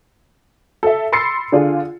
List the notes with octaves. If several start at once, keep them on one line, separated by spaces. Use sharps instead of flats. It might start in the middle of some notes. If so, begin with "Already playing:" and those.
A4 E5
B5 C6 E6 A6 C7 C#7
D3 D4 F4 G#4